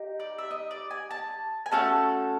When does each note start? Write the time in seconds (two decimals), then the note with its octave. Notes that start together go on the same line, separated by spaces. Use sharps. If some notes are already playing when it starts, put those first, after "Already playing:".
Already playing: D#4 G4
0.20 D5
0.39 E5
0.51 D#5
0.71 D5
0.91 G#5
1.11 A5
1.66 G#5
1.71 A3 C#4 F#4 A4 A5